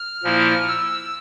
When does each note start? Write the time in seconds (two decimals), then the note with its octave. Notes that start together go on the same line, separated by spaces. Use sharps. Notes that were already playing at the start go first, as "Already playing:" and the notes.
Already playing: F6
0.24 A#2 F3 A#3 E4
0.68 E6